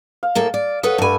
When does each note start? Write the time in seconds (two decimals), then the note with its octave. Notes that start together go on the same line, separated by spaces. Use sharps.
0.23 F5
0.35 A2 A#3 A4
0.54 D5
0.83 A4 B4 C#5 F#5 D#6
0.98 G2 G3 A3 G#5